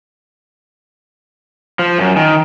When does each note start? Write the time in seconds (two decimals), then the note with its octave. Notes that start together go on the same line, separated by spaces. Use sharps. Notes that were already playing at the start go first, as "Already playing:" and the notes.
1.79 F3
1.99 F#2
2.16 D#3